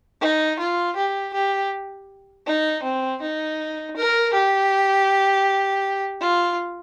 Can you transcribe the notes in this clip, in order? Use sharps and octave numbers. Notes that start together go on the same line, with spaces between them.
D#4
F4
G4
G4
D#4
C4
D#4
A#4
G4
F4